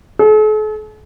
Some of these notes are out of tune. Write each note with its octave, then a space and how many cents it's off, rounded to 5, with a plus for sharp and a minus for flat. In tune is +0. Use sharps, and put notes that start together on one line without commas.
A4 -45